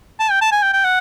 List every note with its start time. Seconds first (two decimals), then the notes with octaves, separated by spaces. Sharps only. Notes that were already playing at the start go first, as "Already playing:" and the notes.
0.19 A5
0.31 G5
0.41 A5
0.52 G#5
0.62 G5
0.73 G5
0.85 F#5